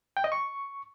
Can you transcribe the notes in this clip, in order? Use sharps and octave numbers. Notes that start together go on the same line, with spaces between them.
G5
D#5
C#6